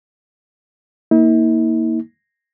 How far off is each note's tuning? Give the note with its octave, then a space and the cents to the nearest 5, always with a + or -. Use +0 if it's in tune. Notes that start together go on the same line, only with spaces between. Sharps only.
A#3 +0 E4 -45